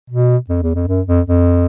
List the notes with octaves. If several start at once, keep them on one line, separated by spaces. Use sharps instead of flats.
B2
F2
E2
F2
F#2
F2
F2